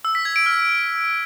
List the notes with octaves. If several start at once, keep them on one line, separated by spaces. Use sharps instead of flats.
E6
B6
G#6
D7
F6